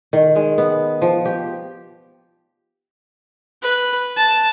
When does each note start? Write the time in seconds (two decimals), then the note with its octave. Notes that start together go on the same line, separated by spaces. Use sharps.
0.13 D#3
0.36 G#3
0.58 B3
1.02 F3
1.26 G4
3.62 B4
4.17 A5